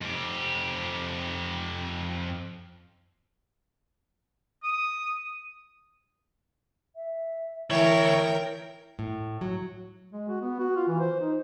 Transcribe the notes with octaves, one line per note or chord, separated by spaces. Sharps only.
F2 G4
D#6
E5
D2 E3 A#4 C#5 E5 G5
A2
F#3
G#3
F#4
B3
F#4
F4
E3
C5
D#4